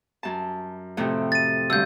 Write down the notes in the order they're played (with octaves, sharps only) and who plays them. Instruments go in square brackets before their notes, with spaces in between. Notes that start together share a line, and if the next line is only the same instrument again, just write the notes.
[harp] F#2 A5
F2 A2 C3
[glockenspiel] A6 D#7
[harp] D2 G2 [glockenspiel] E6 G6